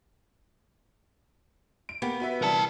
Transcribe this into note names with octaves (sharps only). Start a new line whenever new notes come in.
D7
A#3 B3 G4
F#4 B4 E5
C3 E3 G3 A#4 A5